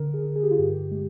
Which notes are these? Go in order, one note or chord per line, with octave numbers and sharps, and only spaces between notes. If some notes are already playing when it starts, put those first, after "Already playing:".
Already playing: D3 A#4
G#4
D3
G#4
G4
F4
G2 G4
G#3